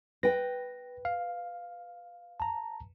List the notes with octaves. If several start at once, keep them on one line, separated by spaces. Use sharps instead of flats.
B4 G5 A#6
F5
A5 A#5